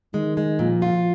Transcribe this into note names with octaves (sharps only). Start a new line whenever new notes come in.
D#3 G#3
G#3
A#2 F3
F4